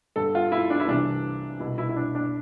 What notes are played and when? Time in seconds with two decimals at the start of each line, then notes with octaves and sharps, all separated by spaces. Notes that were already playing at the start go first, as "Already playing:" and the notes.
0.16 G2 D3 A4
0.35 F4
0.52 E4
0.70 D4
0.80 E4
0.88 C2 C3 E3 D4
1.60 C2 B2 E4
1.78 E4
1.89 E4
1.96 D4
2.15 D4